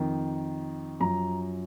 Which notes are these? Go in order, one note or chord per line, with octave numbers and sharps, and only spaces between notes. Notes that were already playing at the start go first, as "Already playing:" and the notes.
Already playing: F2 D#3
F#2 F3 A#5